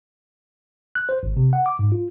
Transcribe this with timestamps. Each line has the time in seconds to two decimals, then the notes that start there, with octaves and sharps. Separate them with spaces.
0.95 F#6
1.09 C5
1.23 G#1
1.37 C3
1.53 F#5
1.66 D6
1.79 G#2
1.92 F4